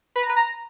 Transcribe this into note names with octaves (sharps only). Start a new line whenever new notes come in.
B4
A#5
B4
A#5